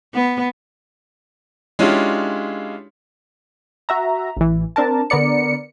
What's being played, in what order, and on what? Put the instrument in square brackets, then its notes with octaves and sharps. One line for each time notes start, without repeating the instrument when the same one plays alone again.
[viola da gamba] B3
[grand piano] G#3 C#4 D4 E4 F4 G4
[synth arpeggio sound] F#4 E5 A#5
A1 E3
C4 D4 A#4 A5
D3 B3 A#4 D5 C#7